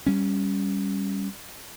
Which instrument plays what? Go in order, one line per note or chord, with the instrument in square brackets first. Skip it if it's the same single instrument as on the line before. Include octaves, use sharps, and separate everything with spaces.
[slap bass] G3 C#4